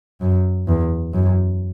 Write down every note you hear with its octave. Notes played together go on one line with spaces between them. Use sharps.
F#2
E2
F#2